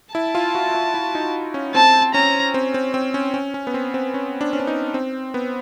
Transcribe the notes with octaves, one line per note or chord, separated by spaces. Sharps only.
E4 A5
F4
F#4
F4
E4
D#4
C#4
C4 A5
C#4 A#5
C4
C4
C4
C#4
C#4
C#4
B3
C4
C4
C#4
D4
C#4
D4
D#4
C4
B3